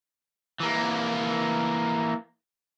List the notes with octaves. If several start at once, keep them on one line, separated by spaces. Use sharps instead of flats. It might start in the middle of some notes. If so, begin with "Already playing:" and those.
E3 A#3